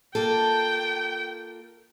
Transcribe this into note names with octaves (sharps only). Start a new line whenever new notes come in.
A#3 F4 A4 G5